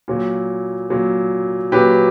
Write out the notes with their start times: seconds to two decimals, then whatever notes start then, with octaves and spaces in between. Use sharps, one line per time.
0.08 A#2 F#3
0.90 A#2 F#3
1.72 A#2 F#3 G4 B4